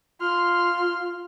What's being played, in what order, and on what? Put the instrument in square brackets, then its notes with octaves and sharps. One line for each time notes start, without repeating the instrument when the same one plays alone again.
[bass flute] F4 [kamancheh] C6 F6